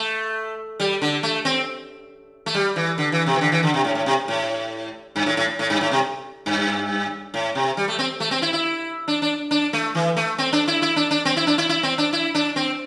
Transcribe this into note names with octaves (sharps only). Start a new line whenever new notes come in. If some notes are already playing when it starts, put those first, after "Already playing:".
Already playing: A3
G3
D3
A3
C4
A3
G3
E3
D3
E3
C3
E3
D3
E3
D3
C3
A2
A2
C3
A2
G2
A2
A2
A2
G2
A2
C3
G2
A2
C3
G3
A3
C4
A3
C4
E4
E4
D4
D4
D4
A3
E3
A3
C4
D4
E4
E4
D4
D4
C4
E4
D4
E4
E4
C4
D4
E4
D4
C4